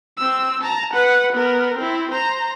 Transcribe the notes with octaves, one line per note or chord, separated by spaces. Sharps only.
C4 E6
A5 A#5
B4 F#5
B3 A#4
C4 E4
C5 A#5